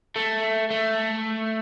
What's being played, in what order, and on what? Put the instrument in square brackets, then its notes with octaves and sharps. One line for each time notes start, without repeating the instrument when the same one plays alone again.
[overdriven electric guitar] A3
A3